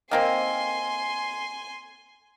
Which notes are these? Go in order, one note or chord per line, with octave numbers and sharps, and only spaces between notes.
D#3 A#3 C4 G#5 C6